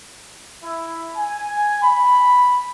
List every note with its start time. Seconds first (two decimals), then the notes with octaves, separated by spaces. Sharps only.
0.64 E4
1.17 G#5
1.83 B5